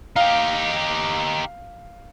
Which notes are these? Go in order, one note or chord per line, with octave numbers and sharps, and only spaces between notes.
D#4 G4 F5